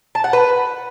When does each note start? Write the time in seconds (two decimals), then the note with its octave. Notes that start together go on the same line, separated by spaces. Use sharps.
0.15 A5
0.24 F#5
0.33 B4